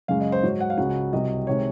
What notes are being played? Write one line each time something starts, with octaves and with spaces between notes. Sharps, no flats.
F#2 C#3 G#3 F5
D#5
C5
G#2 F#3 C#5
F#5
F5
C#2 C#3 F#3 F#5
C2 C3 F#3 D#5
C3 D#3 G#3 C#5